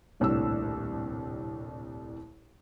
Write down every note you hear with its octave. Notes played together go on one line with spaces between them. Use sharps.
D#1 C2 A2 D4 E6